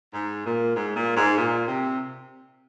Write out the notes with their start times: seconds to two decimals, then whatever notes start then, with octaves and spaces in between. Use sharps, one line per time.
0.13 G#2
0.45 A#2
0.75 G#2
0.96 A#2
1.16 G#2
1.37 A#2
1.67 C3